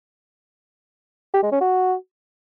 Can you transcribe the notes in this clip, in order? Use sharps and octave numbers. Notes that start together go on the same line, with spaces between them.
G4
G#3
C#4
F#4